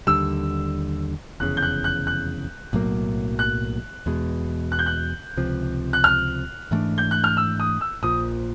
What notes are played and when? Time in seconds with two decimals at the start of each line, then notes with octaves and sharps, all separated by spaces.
0.07 D#2 D3 G3 E6
1.40 F1 E2 C#3 F#6
1.57 G6
1.62 F#6
1.84 F#6
2.07 F#6
2.73 B1 A2 F#3 A#3
3.39 F#6
4.06 E2 B2 G#3
4.72 F#6
4.79 G6
4.86 F#6
5.37 C#2 C3 F3
5.93 F#6
6.04 F6
6.71 G#2 E3 A3 D4
6.98 G6
7.11 F#6
7.24 F6
7.37 E6
7.60 D#6
7.81 E6
8.03 A#1 A#2 F3 D#6